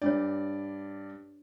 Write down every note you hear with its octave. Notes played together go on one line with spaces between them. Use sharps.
G2 D4 C#5 D5